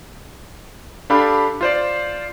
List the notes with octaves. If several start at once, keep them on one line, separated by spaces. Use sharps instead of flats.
D4 G4 A4 F5 B5
F4 C5 D5